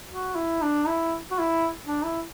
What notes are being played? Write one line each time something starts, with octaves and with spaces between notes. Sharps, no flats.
F#4
E4
D4
E4
F#4
E4
D4
E4